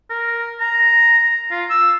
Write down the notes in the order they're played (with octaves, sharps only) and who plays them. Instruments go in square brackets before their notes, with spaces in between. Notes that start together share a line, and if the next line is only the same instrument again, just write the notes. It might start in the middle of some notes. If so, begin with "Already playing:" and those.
[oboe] A#4
A#5
F4
E6